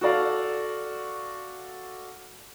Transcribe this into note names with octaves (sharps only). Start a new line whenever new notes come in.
F#4 A4 D5 F5